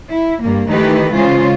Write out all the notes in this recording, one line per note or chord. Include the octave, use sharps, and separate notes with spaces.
E4
G2 A#3
D#3 E3 A3 D#4 G4 B4
C#3 G#3 C#4 F4 C5